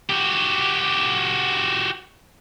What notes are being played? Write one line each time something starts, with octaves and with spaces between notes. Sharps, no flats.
F#4 G4